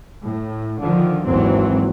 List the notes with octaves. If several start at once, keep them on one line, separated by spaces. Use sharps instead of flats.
A2
D3 D#3 F3
G#1 D#2 E3 F#3 C4